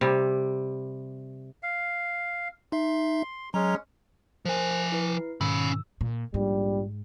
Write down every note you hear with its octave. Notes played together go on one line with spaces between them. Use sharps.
C3 G3
F5
D#4 E5 C6
F#3 G#3 C#4 A#5
F3 A#4 C5 G#5
E4 B4 C7
G#2 B2 D#3 C#4 B5 E6
A#2
A#1 G#2 G3